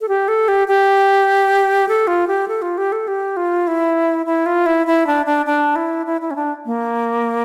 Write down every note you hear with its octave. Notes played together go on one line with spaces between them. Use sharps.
A4
G4
A4
G4
G4
A4
F4
G4
A4
F4
G4
A4
G4
F4
E4
E4
F4
E4
E4
D4
D4
D4
E4
E4
E4
C#4
D4
A#3